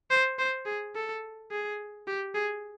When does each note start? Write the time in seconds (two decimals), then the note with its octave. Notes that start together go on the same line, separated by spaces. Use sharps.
0.11 C5
0.39 C5
0.66 G#4
0.95 A4
1.51 G#4
2.07 G4
2.35 G#4